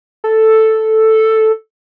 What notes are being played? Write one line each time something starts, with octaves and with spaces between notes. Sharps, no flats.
A4